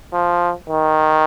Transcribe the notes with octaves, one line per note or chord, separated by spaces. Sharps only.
F3
D#3